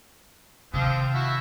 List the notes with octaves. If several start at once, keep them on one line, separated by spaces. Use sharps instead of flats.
C3 D#3 F3 C4 F4
E4 F#4 E5